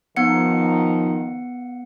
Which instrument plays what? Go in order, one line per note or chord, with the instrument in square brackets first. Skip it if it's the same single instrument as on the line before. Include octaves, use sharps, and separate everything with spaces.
[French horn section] D#3 F3 D#4 [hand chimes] B3 F#5 C#7